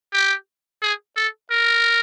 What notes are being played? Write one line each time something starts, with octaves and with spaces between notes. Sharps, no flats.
G4
G#4
A4
A#4